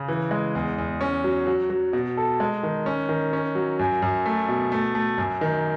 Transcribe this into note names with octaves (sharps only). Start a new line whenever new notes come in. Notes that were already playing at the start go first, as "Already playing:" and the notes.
Already playing: C#3
E3
G#3
E2
E2
C#4
F#3
F#3
F#3
B2
A4
G#3
D#3
C#4
D#3
C#4
F#3
F#2
F#2
A3
B2
A3
A3
F#2
D#3